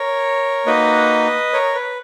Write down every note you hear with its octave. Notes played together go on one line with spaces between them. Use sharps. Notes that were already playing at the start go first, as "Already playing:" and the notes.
Already playing: A#4 C#5
A#3 D#4 F#4 B4 D#5
A#4 C#5
B4